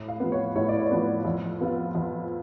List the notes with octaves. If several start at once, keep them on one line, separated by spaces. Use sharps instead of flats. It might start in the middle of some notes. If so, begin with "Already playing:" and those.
Already playing: A2
F5
F3 B3
C#5
A2 C#5
D5
C#5
F3 B3
F2
F3 B3 F4
F2